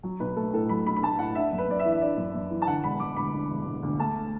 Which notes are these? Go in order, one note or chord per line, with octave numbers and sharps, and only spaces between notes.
F#3
B1 B4
A3 A4
A2 A4
F#3 B5
B1 B5
B5
A3 A5
A2 F#5
D4 E5
F#2
B4
F#2 D5
E5
E3
E5
D4 D5
F#2
F#2
E3
A5
D3 F#5
E1 B5
E1 D6
D2 B5
D3
E1
E1
D2
A3 A5